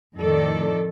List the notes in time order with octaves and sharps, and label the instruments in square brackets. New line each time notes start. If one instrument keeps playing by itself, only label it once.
[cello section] F2 A2 D#3 F3 A4 D5